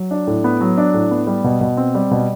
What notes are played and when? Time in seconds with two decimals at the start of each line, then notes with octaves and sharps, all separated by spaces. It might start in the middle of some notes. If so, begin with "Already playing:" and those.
Already playing: F#3
0.11 D4
0.27 A2
0.44 B3
0.61 F#3
0.78 D4
0.94 A2
1.11 B3
1.27 G3
1.44 B2
1.61 B2
1.77 C4
1.95 G3
2.11 B2